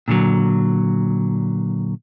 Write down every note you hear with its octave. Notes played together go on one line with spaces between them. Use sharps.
A#2 D3 F3 F#3